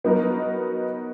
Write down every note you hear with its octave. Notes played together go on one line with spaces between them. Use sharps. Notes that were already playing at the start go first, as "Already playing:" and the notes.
F#3 B3 D#4 F#4 A#4